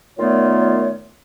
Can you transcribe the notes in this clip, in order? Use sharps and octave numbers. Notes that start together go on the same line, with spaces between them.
A#2 D#3 A3 B3 F4 C#5